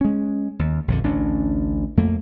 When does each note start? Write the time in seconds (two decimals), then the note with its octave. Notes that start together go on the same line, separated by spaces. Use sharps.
0.01 G#3 C#4
0.59 D#2
0.88 A#1 F2 D3
1.04 A1 D2 C#4 D4
1.97 F2 A3 A#3